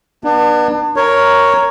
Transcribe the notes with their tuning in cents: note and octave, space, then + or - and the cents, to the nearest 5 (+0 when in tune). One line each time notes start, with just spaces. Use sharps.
B3 -30 D4 +35
A#4 +0 C#5 +5